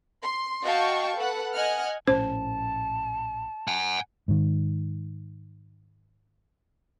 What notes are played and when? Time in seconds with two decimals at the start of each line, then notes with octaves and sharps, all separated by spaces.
0.22 C6
0.64 F#4 D#5 F5 G5 A5 C#6
1.17 A4 B4 F#5
1.55 D#5 F#5 G#5 F6
2.07 A#1 A2 C#4 C5 A5
3.68 F#5 G#5
4.28 G#2 D#3